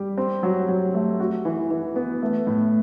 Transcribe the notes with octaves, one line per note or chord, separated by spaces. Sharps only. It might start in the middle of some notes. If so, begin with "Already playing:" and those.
Already playing: G3 G4
C4
F#3
F#3
A3
F#4
E3
E3
B3
A3
A2